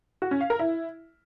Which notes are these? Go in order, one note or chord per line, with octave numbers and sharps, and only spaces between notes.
F#4
C#4
F5
A#4
E4